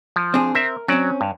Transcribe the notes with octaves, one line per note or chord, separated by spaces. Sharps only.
F3
C4 D4 G#4
C4 A#4 E5
F#3 C4 C#4 D5
G2